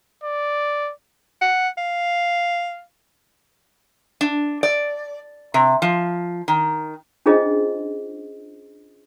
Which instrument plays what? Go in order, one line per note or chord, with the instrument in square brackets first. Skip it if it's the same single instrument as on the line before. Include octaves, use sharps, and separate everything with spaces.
[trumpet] D5
[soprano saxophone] F#5
F5
[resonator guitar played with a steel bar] D4
D5
C3
F3
D#3
[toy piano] C#4 D4 F4 G#4 C5 D#5